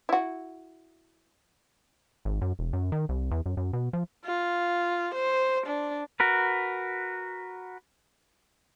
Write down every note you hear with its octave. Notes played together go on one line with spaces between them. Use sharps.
E4 F#4
G#1
F#2
E1
F#2
D#3
C2
E2
F#2
F#2
B2
F3
F4
C5
D4
F#4 A#4 B4